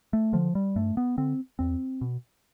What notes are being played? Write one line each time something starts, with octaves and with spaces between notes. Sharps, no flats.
A3
D3 F3
G3
G2 A3
B3
D3 C4
E2 C4
B2